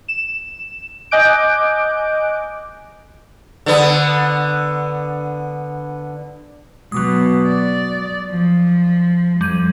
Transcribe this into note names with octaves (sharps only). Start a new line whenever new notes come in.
E7
D#5 G#5 D6 F#6 G6 D7
D3 B3
B2 F#3 D6 D#6
D5
F3
F2 G3 G#6 D#7